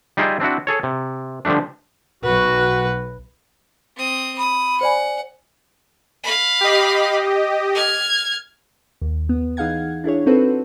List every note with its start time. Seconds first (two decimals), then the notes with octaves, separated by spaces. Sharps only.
0.17 G3 D#4 F4 G#4 E5 G5
0.40 C4 D4 E4 F#4
0.67 G#4 A4 C#5
0.83 C3
1.45 D3 F3 G3 A3 D4
2.24 B1 F#4 B4
3.97 C4 D#6
4.38 B5 D#6
4.81 C5 D5 F#5 G#5
6.23 F5 B5
6.60 G4 D#5
7.75 F6 G#6
9.01 D#2
9.29 B3
9.57 E3 D#4 G#4 F5 F#5 G#6
10.04 D4 E4 G#4 C#5
10.26 C4 D#4 F#4 A4 B4 C5